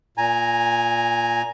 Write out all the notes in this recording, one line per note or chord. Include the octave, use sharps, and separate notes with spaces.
A#2 G#5 A#5